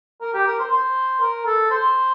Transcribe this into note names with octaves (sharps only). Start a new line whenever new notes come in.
A#4
G4
A#4
C5
C5
A#4
A4
C5